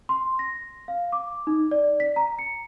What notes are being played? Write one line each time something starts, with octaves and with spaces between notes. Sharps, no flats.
C6
A#6
F5
D6
D#4
D5
B6
A#5
C#7